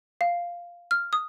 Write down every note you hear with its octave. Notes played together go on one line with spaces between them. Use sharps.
F5
F6
D#6